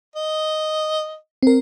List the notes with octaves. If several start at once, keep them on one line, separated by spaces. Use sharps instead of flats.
D#5
C4 A#4